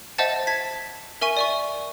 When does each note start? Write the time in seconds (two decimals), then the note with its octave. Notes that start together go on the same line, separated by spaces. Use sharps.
0.18 C5 D#5 E5 F#5 A5 A6
0.47 A5 G#6 B6
1.21 A#4 E5 G#5 C#6 D#7
1.37 D5 E5 C#6